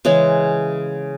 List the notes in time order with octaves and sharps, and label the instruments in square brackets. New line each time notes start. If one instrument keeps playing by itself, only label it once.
[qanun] C#3 E3 G#3 C#4